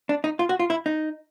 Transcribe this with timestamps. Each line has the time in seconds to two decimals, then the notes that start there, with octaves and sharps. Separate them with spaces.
0.09 D4
0.24 D#4
0.39 F4
0.49 F#4
0.59 F4
0.70 E4
0.86 D#4